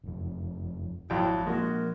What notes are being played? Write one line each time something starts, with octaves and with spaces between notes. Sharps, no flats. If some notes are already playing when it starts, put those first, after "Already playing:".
F#1 F2
G#1 F2 F#3 E4 G5
F3 G#3 A#3 F#4 A#4